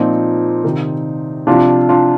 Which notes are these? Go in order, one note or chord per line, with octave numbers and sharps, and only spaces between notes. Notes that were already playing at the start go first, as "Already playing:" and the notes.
Already playing: A#2 F3 C4 D#4
C3 D#3
C3 F3 D4 F4
D4 F4